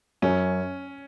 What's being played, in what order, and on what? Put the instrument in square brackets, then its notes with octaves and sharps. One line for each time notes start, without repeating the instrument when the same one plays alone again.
[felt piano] F#2 [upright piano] C#4